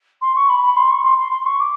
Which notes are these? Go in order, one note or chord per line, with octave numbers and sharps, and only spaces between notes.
C6
C#6
B5
B5
C6
C#6
C6
C6
C6
C#6
D6